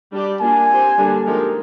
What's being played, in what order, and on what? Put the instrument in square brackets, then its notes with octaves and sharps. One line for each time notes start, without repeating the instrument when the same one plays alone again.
[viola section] G3 D4 G4 D5
[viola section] A#3 D4 F4 [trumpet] G#5
[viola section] C4 G4 C5
D3 G3 A#3 D4
F3 G#3 D#4 G4 A#4